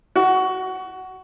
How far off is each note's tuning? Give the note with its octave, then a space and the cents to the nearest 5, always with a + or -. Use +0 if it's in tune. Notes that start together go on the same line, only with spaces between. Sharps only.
F#4 +15